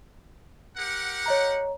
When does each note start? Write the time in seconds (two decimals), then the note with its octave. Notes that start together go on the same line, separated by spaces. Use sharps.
0.77 G4 A#4 F#5
1.26 C#5 D#5 A#5